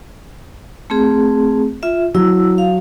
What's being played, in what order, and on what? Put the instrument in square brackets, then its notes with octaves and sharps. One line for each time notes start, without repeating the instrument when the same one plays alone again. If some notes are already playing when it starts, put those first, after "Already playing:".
[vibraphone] A3 C4 G#4
F4 E5
[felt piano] F#3 [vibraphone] E4 E6
[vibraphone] F5